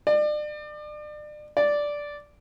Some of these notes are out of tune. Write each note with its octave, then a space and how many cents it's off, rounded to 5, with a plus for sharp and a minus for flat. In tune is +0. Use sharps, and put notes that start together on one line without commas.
D5 +35
D5 -5